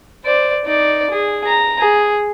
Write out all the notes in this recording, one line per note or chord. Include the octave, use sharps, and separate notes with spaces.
C5 D5
D#4 D5
G#4
A#5
G#4